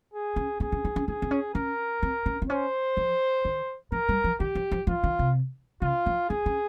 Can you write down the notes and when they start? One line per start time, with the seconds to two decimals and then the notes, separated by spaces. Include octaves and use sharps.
0.13 G#4
0.36 C#4
0.60 C4 G#4
0.72 C#4
0.85 D#4
0.96 C#4
1.08 D#4 G#4
1.22 C4
1.31 C#4
1.55 C#4 A#4
2.03 C4
2.26 C#4
2.42 C4
2.50 C#4 C5
2.97 F3
3.45 D#3
3.92 F3 A#4
4.09 G3
4.24 F3
4.40 D#3 G4
4.55 F3
4.71 F3
4.87 F3 F4
5.04 D#3
5.19 C3
5.82 C#3 F4
6.06 F3
6.29 D#4 G#4
6.46 C#4